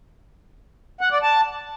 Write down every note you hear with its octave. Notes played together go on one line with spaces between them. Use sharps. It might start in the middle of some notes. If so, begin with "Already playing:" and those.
F#5
D5
A5